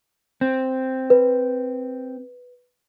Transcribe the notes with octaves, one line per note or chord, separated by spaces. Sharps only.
C4
B4